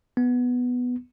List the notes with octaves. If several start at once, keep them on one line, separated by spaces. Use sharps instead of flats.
B3